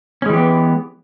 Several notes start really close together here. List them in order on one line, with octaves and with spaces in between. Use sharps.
C#4 G#3 E3 G4 B3